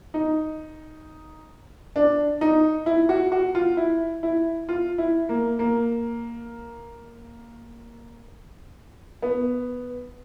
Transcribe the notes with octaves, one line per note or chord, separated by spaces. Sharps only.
D#4
D4
D#4
E4
F#4
F#4
F4
E4
E4
F4
E4
A#3
A#3
B3